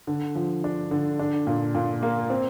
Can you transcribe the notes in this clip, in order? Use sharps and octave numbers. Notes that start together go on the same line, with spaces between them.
D3
F3
D4
D3
D4
A#2
A#2
A#3
C4